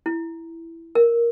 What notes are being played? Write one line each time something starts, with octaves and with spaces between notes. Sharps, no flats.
E4
A#4